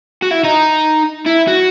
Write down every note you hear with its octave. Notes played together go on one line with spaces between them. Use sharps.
F#4
E4
D#4
E4
F#4